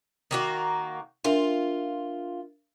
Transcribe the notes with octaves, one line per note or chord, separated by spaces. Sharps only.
D#3 A#3 F#4
D4 F4 A#4 E5